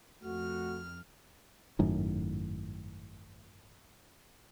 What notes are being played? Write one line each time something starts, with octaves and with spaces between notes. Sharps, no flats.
F2 A3 F#4 F6
G#1 F#2 A2 D#3